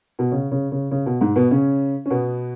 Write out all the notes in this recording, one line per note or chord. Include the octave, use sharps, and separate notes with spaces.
B2
C#3
C#3
C#3
C#3
B2
G#2 G#3
B2 B3
C#3 C#4
C#4
B2 B3